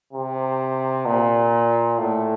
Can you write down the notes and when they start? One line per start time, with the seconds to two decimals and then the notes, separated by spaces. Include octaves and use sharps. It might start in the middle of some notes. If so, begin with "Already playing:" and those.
0.13 C3
1.06 A#2
1.98 A2